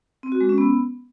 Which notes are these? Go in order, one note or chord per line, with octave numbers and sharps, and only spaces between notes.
C4
F#4
G#3
C#4
B3